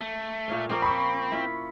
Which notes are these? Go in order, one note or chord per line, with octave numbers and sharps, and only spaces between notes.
A3
A#2 C#5 F5
F3 A#3 C4 C#4
B5 C#6
E4 F4